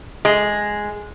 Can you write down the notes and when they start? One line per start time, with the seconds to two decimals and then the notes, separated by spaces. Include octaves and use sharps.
0.25 G#3